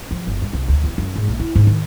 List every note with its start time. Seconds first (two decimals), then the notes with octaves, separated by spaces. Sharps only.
0.11 F3
0.27 G1
0.42 G3
0.53 C2
0.68 D2
0.84 E2
0.98 F#2
1.16 G#2
1.28 A#1
1.40 E4
1.55 G#2
1.67 D#3